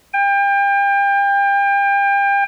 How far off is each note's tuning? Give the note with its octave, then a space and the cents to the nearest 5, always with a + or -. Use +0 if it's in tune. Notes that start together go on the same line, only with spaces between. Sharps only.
G5 +35